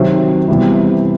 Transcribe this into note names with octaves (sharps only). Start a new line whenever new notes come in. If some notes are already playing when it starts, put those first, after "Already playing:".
Already playing: C3 D#3 F#3 C5 E5
C3 E3 G3 B3 E4